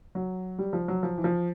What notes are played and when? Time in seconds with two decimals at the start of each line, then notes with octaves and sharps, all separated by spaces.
0.15 F#3
0.58 G3
0.73 F3
0.88 F#3
1.03 F3
1.18 E3
1.24 F3